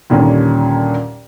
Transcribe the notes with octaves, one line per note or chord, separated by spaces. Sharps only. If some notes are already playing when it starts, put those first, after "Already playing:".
D#2 A#2 D3 G3 C#4